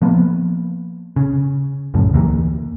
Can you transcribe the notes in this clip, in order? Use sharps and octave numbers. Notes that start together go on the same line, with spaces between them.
F3 A#3 B3
C#3
C#2 F#2 A2 C#3
D2 E3 A#3